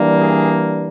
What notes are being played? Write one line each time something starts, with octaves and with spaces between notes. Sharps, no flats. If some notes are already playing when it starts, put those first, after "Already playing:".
Already playing: E3 G3 A#3 D4
G#4